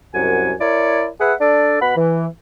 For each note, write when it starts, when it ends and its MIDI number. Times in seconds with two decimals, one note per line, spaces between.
0.14 0.52 36
0.14 0.52 42
0.14 0.52 78
0.14 0.52 80
0.60 1.07 64
0.60 1.07 70
0.60 1.07 73
0.60 1.07 74
1.20 1.33 68
1.20 1.33 71
1.20 1.33 76
1.20 1.33 78
1.40 1.80 62
1.40 1.80 69
1.40 1.80 74
1.81 1.94 47
1.81 1.94 78
1.81 1.94 83
1.96 2.26 52